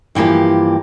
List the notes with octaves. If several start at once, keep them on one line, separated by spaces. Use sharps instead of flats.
G2 E3 F3 A#3 G4